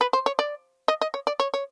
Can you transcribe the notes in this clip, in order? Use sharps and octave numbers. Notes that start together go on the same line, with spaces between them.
B4
C5
C#5
D5
D#5
D#5
C#5
D5
C#5
C#5